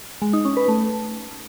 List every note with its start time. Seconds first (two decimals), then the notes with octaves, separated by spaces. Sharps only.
0.22 G#3
0.33 D#4
0.45 C#4
0.57 B4
0.68 A3